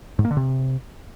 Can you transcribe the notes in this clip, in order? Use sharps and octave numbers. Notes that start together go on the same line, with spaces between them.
G#2
A#3
D3
C3